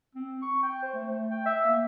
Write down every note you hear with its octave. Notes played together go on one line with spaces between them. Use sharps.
C4
C#6
G5
C5
A3
G5
E5
A#3